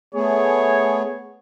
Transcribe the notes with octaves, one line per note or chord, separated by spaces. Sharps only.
A3 B3 G#4 C#5